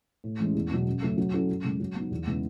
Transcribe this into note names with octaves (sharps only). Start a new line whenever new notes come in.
A2
E3 G#3 C#4
E2
B2 F#3
F#2
C#3 F#3 A3
F#3
C#4 E4 A4
F#2
C#3 G#3
F#3
B3 D#4
E2
C#3 G#3 B3 E4